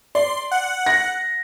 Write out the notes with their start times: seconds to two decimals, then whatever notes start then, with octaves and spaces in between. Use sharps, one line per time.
0.15 D5 C6
0.51 F#5
0.86 A#6